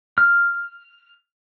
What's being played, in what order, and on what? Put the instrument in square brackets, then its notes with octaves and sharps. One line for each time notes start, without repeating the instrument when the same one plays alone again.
[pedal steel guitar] F6